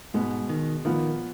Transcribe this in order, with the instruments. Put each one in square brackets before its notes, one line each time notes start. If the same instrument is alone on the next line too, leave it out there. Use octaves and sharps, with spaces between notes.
[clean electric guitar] G#2 [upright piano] B2 G#3 B3
[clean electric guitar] D#3
[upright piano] A#2 F3 B3 [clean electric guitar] D#3